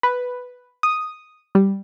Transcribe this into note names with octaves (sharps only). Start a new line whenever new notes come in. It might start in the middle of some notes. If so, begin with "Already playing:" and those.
B4
D#6
G3